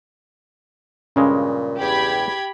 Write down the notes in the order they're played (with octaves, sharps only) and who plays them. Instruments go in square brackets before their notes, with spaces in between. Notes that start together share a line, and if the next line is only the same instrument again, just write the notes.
[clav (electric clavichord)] G2 C#3 G#3 [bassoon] A#2 [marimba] C#4
[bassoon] E2 [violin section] G4 B5 G#6